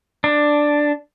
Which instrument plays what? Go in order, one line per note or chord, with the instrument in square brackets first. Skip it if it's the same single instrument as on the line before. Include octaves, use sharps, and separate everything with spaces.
[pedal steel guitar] D4